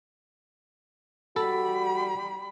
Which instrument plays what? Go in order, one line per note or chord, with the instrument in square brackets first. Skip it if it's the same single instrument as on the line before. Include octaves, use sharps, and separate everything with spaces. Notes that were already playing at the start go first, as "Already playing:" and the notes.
[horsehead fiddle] G3 B5 [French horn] F#4 [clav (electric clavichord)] A4